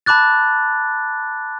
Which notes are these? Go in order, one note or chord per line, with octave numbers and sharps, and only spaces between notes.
A5 B5 D6 F#6 A6